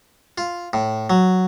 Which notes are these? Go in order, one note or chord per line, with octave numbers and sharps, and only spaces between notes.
F4
A2
F#3